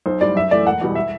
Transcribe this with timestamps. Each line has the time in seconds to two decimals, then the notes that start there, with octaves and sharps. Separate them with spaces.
0.06 B1 C5
0.21 A2 G3 D5
0.36 F#2 E5
0.51 E3 A3 D5
0.65 E1 F#5
0.81 E2 B2 G3
0.95 E5